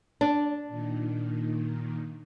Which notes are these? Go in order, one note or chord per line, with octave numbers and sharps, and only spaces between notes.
D4
A#2 D#3